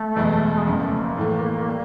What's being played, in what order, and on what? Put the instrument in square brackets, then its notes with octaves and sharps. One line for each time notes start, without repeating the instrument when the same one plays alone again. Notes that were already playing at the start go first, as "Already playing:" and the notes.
Already playing: [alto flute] A3
[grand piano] F#1 E2 B2 G#3 B3
[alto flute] G#3
[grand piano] F#1 F2 C#3 [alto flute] A3
[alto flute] A#3
A3
A#3
[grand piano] A2 E3 A3
G3